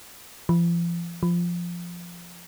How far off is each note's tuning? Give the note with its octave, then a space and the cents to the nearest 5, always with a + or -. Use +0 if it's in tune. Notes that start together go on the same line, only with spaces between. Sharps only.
F3 -40
F3 -5